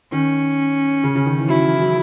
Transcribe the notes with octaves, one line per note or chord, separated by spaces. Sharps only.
D#3 C#4
C#3
C#3
D#3
E3
F#3 E4
E3
F#3